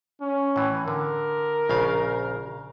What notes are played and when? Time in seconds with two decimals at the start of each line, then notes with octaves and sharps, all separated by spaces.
0.22 C#4
0.56 A2 E3
0.88 D3 A#4
1.69 A#1 C#3 F5